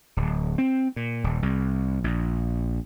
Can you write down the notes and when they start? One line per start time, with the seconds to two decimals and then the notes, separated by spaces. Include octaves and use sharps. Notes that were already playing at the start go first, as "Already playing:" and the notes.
0.17 D1
0.58 C4
0.96 A#2
1.24 D#1
1.42 C2
2.04 A#1